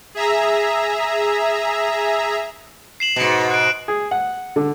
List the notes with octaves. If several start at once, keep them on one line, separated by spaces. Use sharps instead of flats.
G#4 E5 A#5
C7 E7 F#7
G#2 B2
F#6 D7
G#4
F#5
D3